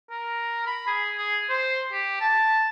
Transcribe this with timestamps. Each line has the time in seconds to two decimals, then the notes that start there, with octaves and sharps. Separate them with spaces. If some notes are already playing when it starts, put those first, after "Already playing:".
0.11 A#4
0.67 B5
0.87 G#4
1.17 G#4
1.50 C5
1.93 G4
2.21 A5